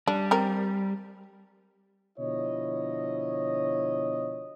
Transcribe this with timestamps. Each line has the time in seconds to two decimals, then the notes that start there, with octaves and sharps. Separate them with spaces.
0.08 G3 D4
0.31 C4 A#4
2.19 B2 D3 F3 E4 C#5 D#5